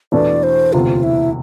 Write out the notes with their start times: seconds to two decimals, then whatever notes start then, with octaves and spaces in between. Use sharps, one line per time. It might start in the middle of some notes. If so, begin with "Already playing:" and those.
0.12 E2 B2 A3 D4 D5
0.43 C5
0.73 E1 D2 C3 F4
1.03 E4